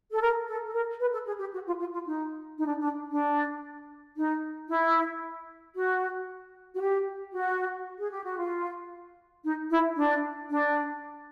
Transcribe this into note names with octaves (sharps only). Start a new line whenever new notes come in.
A4
A#4
A4
A4
A#4
B4
A4
G#4
G4
F#4
F4
F4
F4
D#4
D#4
D4
D4
D4
D#4
E4
F#4
F#4
G4
F#4
G#4
G4
F#4
F4
D#4
E4
D4
D4